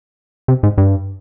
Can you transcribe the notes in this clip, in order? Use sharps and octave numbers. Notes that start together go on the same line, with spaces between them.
C3
G#2
G2